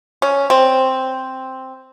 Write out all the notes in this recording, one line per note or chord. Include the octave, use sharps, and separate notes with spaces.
C#4
C4